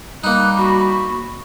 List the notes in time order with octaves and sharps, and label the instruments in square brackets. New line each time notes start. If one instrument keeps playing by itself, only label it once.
[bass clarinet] G3 [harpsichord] A#3 D#4 [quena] F#6
[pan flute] F#4 [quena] B5